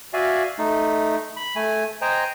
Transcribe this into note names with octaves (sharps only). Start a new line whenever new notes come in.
F#4 D5 E5 F5 G#5
A3 D#4
B5
A3 G#5
C5 D#5 G5 G#5 A#5